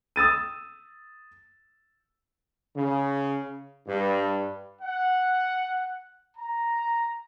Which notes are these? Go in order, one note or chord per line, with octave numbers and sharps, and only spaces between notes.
D#6 E6 A6 D#7
C#3
G2
F#5
A#5